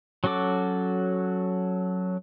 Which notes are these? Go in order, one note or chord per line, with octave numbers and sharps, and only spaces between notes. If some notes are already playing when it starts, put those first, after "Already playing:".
F#3 C#4 F#4 A4 D6